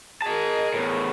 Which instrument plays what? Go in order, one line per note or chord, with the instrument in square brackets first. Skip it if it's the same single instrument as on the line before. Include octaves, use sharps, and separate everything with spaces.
[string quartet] G#4 A#4 [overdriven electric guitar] D#5 A5
[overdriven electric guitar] E2 A2